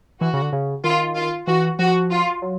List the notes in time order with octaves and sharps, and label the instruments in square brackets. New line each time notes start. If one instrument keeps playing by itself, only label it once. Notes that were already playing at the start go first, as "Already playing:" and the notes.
[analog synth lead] E3 [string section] F#4
[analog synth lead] C#3
D3
C#3
[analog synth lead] D#3 [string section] F4
[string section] F4
[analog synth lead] E3 [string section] F#4
[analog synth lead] F3 [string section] F#4
[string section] F4
[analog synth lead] F#3